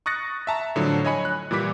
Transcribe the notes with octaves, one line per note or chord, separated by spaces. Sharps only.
C#6 D#6 F#6 A6 A#6 C#7
E5 A5 A#5
A2 D3 F3 F#3
C#5 D#5 G#5 B5 C#7
F#6
A#2 E3 G3 B5 D6 B6